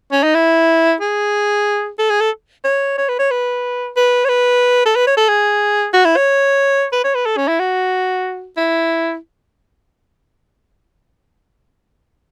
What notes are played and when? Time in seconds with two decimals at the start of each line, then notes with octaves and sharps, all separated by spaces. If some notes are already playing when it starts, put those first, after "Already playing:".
0.12 C#4
0.23 D#4
0.35 E4
1.01 G#4
1.99 A4
2.10 G#4
2.20 A4
2.64 C#5
2.98 C#5
3.09 B4
3.19 C#5
3.31 B4
3.97 B4
4.25 C#5
4.29 B4
4.86 A4
4.96 B4
5.07 C#5
5.17 A4
5.29 G#4
5.94 F#4
6.05 E4
6.16 C#5
6.92 B4
7.04 C#5
7.15 B4
7.26 A4
7.37 C#4
7.48 E4
7.59 F#4
8.57 E4